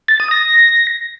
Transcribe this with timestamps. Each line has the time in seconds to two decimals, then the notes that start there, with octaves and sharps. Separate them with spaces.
0.08 A6
0.20 D#6
0.31 A#6